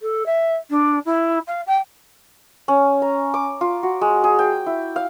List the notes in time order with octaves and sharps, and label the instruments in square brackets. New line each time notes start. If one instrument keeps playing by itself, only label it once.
[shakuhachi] A4
E5
D4
E4
F5
G5
[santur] C#4
A#5
D6
F4
F#4
G#3
G#4
G5
E4
F5